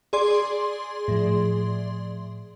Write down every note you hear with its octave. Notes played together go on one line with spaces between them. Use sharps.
G#4 D5 C6
A2 F3